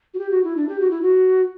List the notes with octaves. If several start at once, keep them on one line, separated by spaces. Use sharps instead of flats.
F#4
G4
F#4
E4
D4
G4
F#4
E4
F#4